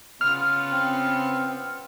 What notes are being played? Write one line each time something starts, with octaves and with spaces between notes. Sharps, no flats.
C#3 B3 F4 F6
C4